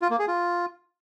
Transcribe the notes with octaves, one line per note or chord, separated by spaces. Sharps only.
F4
A#3
G#4
F4